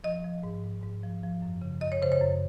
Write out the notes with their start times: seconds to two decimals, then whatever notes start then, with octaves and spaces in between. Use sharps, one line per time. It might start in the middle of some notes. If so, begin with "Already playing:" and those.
0.04 F3 D#5
0.24 F3
0.43 G#2
0.63 G#2
0.83 G#2
1.03 F3
1.23 F3
1.42 F#2
1.62 C#3
1.81 F#2 D#5
1.92 C#5
2.02 C#3 C5
2.12 C#5
2.21 F#2